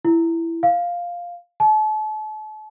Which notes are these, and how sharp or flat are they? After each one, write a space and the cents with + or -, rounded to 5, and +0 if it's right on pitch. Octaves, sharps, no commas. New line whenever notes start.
E4 +10
F5 +0
A5 -40